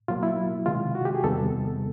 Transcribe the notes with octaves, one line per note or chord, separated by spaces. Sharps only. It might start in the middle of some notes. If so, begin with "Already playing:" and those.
B2 F#3 A#3 F4
E4
C3 D#3 G#3 F4
F#4
G4
G#4
E2 C3 D#3 G3 B3 A4